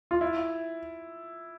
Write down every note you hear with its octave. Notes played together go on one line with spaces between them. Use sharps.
F4
E4